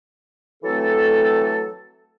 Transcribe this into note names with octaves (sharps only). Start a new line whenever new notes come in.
E3 F#3 A3 C4 A4